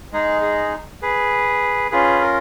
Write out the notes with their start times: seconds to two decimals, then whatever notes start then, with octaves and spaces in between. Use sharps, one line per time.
0.12 G#3 D#4 G#4
0.42 G#4
1.02 G#4 B4
1.91 C#4 F4 G#4 B4
2.21 A#4